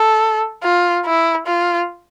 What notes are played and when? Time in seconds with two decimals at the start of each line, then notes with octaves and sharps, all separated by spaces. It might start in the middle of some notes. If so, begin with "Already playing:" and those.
Already playing: A4
0.63 F4
1.06 E4
1.47 F4